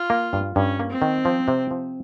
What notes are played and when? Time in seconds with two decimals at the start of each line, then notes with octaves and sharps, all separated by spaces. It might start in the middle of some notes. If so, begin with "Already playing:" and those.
Already playing: F4
0.10 A#3
0.33 G2
0.56 G2 C#4
0.80 A#3
0.90 C4
1.02 D#3
1.25 F3
1.48 C3
1.71 F3